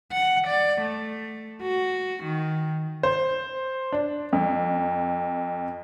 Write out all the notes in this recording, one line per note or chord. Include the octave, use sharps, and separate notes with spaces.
F#5
D5
A3
F#4
D#3
C5
D4
F2